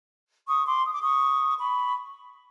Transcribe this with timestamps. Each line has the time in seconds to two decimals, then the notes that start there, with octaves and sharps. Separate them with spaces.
0.48 C#6 D#6
0.66 C6 D6
0.85 D#6
0.93 D6
1.02 C#6 D#6
1.59 B5 C#6